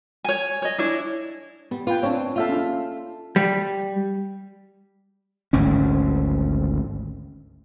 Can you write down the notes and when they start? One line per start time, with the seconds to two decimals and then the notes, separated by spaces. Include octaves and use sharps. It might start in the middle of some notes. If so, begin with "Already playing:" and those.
0.24 C#5 G#5
0.62 C#5 D#5
0.78 D4 E4 C#5
1.71 G3 B3
1.87 F4 B4 G5
2.03 C4 D4 C#5
2.36 A#3 F4 A4 E5 F5
2.49 C#4 D4
3.36 G3
5.53 G#1 D2 C#4